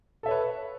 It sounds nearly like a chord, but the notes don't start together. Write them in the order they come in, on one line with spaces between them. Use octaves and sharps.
A4 E5 C#5 B4